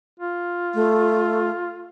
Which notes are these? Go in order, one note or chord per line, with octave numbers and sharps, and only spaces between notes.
F4
A3